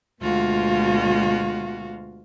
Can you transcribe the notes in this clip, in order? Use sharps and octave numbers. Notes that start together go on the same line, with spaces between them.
D2 B2 G#3 F4 F#4 F5